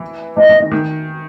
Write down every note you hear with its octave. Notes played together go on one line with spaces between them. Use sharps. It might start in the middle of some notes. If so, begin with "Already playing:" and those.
Already playing: E3
E3 D#5
E3
D#3
D#3